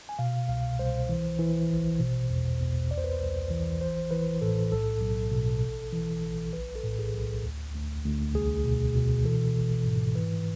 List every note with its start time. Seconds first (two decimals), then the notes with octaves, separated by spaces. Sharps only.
0.09 G#5
0.19 B2 F5
0.48 C2 F5
0.79 C2 C5
1.09 E3
1.39 E3
1.70 A1
1.99 B2
2.30 E2
2.60 E2
2.91 C2 D5
2.98 C5
3.04 B4
3.12 C5
3.20 C2
3.51 E3
3.81 A1 C5
4.11 E3 B4
4.42 A2 A4
4.72 B1 A4
5.02 B1
5.32 B2
5.62 A1
5.93 E3
6.23 A1
6.53 B1 B4
6.76 A4
6.83 A2
6.99 G#4
7.14 B1
7.43 D2
7.74 D2
8.04 D2
8.34 C2 G#4
8.64 B2
8.95 B2
9.24 E3 A4
9.55 G#1
9.86 G#2
10.15 E3 B4